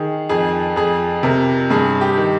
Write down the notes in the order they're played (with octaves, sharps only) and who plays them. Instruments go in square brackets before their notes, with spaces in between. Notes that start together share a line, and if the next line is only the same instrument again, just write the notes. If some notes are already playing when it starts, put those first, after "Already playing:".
Already playing: [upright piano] D#3 G#4
F2 G#4
F2 G#4
C3 A#4
G2 G#4
G4
D#3